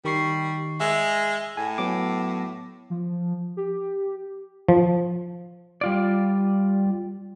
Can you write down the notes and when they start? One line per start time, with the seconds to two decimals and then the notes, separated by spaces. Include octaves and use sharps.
0.05 D#3 G3 C#6 C7
0.80 G#3 E5 E6
1.57 A2 G#5
1.78 F#3 B3 D6
2.90 F3
3.57 G4
4.69 F3
5.81 G3 F4 D5